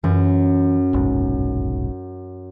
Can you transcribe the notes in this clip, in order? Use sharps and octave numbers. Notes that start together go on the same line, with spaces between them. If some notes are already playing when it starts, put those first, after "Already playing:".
F#2 E3
F1 B1 G#2